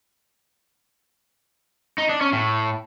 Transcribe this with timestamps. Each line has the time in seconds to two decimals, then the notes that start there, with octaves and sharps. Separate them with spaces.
1.98 D#4
2.09 D4
2.21 C#4
2.32 A2